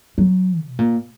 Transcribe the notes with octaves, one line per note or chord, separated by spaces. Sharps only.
F#3
B2
A#2